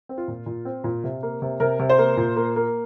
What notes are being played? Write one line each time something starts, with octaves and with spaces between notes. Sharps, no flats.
C4
F4
A#2
A#2
C4
A#2
C3
A#3
C3
C3 A#4
C3
C5
A#3
A#2
A#3
A#3